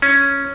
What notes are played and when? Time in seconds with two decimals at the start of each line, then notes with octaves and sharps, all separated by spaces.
0.02 C#4